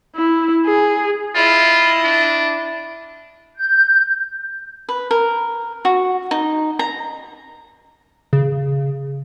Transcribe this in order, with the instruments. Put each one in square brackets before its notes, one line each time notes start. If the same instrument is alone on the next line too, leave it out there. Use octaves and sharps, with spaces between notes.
[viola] E4
G#4
[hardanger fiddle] E4 D#5 [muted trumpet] F4
[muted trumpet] D4
[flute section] G6
[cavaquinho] B4
A#4
F#4
D#4
A#5
[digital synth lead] C#3